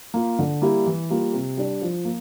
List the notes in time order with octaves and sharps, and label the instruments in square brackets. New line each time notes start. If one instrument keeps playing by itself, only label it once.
[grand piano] A#3 F4
D3
G3 A#3 E4 G4
E3
G3 A#3 F4
C3
G3 D4
F3
A#3